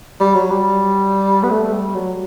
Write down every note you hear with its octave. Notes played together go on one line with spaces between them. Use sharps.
G3
F#3
G3
B3
A3
G3
F#3